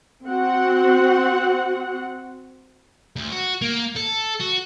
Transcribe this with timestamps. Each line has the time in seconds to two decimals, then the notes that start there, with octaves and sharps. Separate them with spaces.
0.25 C4 F#4 F#5
3.16 D2
3.32 F#4
3.62 A#3
3.96 A4
4.40 F#4